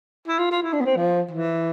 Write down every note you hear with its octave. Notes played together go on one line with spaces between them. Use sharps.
E4
F4
F4
E4
D4
B3
C4
F3
E3